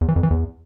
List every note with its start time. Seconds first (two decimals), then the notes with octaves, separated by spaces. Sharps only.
0.01 E2
0.08 E3
0.16 F2
0.23 E3
0.31 E2